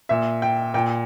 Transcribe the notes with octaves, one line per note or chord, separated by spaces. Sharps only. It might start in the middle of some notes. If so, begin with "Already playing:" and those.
A#2 E5
G5
A#2 G5